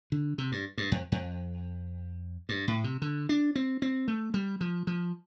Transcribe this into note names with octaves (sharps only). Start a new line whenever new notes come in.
D3
C3
G2
G2
F2
F2
G2
A2
C3
D3
D4
C4
C4
A3
G3
F3
F3